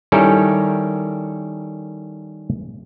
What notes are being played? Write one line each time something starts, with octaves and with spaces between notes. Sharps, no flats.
D#3 G3 C#4 E4 A4 A#4